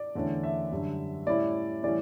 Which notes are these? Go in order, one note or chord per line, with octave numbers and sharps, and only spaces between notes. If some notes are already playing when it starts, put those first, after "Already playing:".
Already playing: D5
E2 D3 A3 C#4
E5
F#2 D3 G3
A2 G3 C#4 E4 D5
A2 E3 G3 C#4 D5